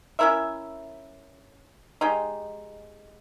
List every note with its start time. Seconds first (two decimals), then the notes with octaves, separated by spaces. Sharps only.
0.19 C#4 E4 A#4 E5
2.01 G#3 D#4 G4